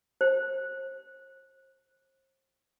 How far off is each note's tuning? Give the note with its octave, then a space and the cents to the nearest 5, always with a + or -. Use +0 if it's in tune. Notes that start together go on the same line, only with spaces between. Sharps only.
C5 +35